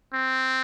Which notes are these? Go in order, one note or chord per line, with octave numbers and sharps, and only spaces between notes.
C4